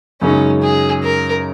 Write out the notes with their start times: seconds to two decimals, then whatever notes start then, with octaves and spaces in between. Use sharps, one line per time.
0.22 F#2 C#3 G#3 C#4 D#4
0.62 G#4
1.03 A#4